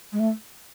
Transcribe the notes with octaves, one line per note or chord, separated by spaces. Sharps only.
G#3
A3